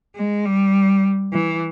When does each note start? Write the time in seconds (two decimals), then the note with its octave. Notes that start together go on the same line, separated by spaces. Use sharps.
0.15 G#3
0.45 G3
1.33 E3